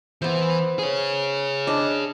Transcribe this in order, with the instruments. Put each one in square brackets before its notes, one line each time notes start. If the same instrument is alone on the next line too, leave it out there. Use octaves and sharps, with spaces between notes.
[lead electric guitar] E3 [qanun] B3 C5
[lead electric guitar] G#4 C#5
[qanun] D4 D#5